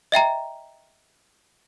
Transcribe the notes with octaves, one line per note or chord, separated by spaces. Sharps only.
D#5 E5 G5 A#5